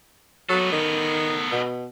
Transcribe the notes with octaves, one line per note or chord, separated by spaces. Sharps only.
F#3 B3 A4
D#3
B2